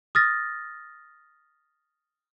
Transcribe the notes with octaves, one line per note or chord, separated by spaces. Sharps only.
D#6 F6 A6 A#6